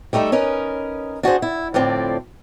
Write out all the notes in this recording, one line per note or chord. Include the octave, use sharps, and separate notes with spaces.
G3 A3 D#4 A4 E5
C#4 D#4 A#4 B4
D4 F#4 G#4 C5
E4
A2 D3 F3 C4 D5